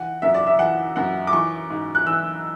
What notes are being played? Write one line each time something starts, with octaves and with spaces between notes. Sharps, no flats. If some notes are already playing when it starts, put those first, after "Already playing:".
Already playing: E3 F#5
F#2 E5
D5
E5
E3 F#5
F#2 F#5
D6
E3 C#6
G#2
F#6
E3 E6